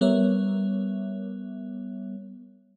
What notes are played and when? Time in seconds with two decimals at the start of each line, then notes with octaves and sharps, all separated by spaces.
0.01 G3 B3 A#4 C#5 E5